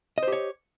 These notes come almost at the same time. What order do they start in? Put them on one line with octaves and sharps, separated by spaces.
D#5 C5 G4 C#5